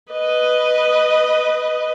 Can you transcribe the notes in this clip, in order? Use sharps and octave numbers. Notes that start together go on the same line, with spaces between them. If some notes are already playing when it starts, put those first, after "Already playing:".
B4 D#5